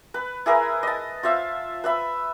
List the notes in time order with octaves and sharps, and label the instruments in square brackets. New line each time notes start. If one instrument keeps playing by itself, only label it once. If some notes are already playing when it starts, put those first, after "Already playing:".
[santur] B4
E4 G#4 A#4 B4
D#5 A5
F4 C5 E5 F5
B4 E5 B5